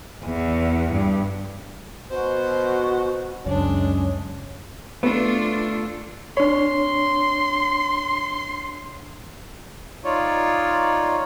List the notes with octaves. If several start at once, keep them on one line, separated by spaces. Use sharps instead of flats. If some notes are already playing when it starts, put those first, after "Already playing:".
E2
G2
B2 F#4 C5
C#2 F#2 G#3 C#4 D4
A3 B3 D4 F4
D4 C#5 C6
D#4 F4 C#5 D5